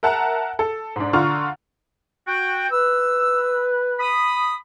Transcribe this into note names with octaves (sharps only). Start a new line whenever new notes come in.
A#4 E5 F#5 A5 A#5
A4
G#2 D4
D3 F4 A#5 C#6 F6
F#4 G5
B4 E6
B5 D#6